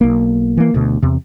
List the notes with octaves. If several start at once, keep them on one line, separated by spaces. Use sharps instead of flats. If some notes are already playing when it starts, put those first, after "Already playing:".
B1 A#3
E3 A#3
D2 B2
E2 C3